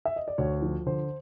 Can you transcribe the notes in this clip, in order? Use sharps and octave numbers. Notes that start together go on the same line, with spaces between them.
E5
D#5
D5
D2 C#5
F3
D3 C5